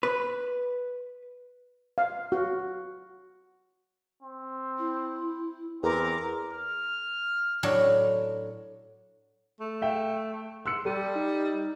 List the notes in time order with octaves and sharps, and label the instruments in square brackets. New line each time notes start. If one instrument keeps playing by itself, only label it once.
[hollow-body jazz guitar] B4
[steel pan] F5
F#4
[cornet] C4
[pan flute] E4
[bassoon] E2 [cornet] C4 [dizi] A#4 [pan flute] D6
[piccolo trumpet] F6
[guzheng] A2 F#3 D4
[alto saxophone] A3
[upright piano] E5 F5 G5
[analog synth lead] C6 [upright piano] E6 F#6 C#7
[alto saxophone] G3 [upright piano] G4 [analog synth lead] A4
[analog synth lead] D#4